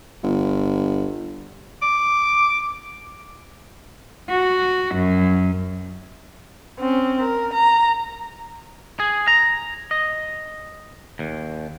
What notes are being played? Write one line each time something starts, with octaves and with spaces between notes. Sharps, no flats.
G1
D6
F#4
F#2
C4 C#4
A#4
A#5
G#4
A#5
D#5
D#2